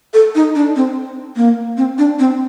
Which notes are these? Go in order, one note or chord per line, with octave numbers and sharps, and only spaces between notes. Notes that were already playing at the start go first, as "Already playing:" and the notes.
A4
D#4
D4
C4
A#3
C4
D4
C4